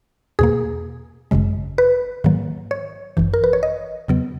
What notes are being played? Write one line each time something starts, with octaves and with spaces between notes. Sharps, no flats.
E2 B2 A#3 G#4
G#1 F#2 C#3 G#3
B4
G#2 D#3 F#3 A#3
C#5
G#1 F#2 E3
A#4
B4
C#5
D#5
E2 C#3 F#3 B3